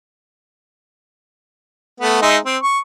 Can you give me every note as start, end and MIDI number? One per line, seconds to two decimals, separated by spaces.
2.00 2.17 57
2.00 2.17 59
2.22 2.37 56
2.22 2.37 63
2.22 2.37 76
2.45 2.57 60
2.63 2.79 85